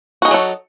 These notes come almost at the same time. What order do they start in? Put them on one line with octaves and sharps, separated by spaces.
F#4 D#4 G#4 F#3 A4